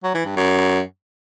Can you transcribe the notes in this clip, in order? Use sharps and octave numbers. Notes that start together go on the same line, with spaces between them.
F#3
E3
G2
F#2